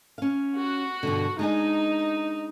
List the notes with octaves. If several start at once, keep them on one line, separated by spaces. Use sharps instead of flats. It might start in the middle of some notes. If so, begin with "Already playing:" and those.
C#4 F5
F#4
G2 B2 D3
G#3 D4 D#4 G#5